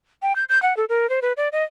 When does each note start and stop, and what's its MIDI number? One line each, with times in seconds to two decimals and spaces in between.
0.22 0.35 79
0.36 0.44 91
0.49 0.61 91
0.63 0.76 78
0.77 0.85 69
0.89 1.09 70
1.10 1.20 72
1.22 1.33 71
1.37 1.49 74
1.52 1.64 75